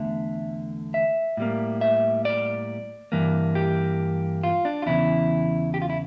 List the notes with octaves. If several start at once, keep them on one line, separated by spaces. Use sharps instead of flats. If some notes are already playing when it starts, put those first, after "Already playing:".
Already playing: E2 D3 A3 E5
E5
A2 G3 A#3
E5
D5
G2 E3 A#3
G4
F4
D4
F4
E2 C#3 E3 E4
G4
F4
E4